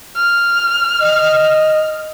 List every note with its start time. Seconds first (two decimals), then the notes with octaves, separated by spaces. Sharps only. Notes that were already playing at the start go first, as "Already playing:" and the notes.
0.16 F6
1.02 D#5